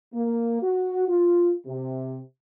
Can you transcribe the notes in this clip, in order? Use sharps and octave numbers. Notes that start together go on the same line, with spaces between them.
A#3
F#4
F4
C3